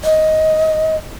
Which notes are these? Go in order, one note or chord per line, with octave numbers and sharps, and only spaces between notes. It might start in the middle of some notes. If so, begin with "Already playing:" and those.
D#5